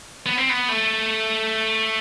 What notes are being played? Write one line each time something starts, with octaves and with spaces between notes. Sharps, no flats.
B3
C4
B3
A3